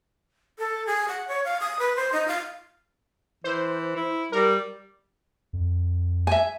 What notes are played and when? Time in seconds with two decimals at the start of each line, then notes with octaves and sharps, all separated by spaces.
0.59 A4
0.87 G#4
1.08 F#5
1.28 C#5
1.45 F5
1.61 D#6
1.79 B4
1.96 C5
2.13 D#4
2.28 F5
3.44 E3 C5
3.96 E4
4.32 G3 A#4
5.53 F2
6.27 E5 G#5